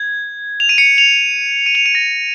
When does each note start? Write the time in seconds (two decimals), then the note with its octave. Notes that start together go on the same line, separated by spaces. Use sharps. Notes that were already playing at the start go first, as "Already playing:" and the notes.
Already playing: G#6
0.60 F7
0.69 D#7
0.78 C#7
0.98 F7
1.66 D#7
1.75 F7
1.86 D#7
1.95 A#6